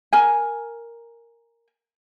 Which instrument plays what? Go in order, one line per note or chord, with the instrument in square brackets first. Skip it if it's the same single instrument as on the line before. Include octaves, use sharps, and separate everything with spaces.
[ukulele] A#4 G#5